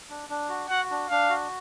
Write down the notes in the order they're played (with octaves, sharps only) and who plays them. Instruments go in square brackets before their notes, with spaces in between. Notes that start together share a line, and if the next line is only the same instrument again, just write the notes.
[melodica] D4
D4
F#4
[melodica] F#4 [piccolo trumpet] F#5
[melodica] D4
[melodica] D4 [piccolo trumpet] F5
[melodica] F#4